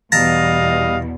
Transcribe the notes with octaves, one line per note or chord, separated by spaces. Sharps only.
E2 B2 G3 D#5 F5 A5 A#5